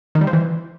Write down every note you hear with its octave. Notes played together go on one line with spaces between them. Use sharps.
D#3
G3
F3
E3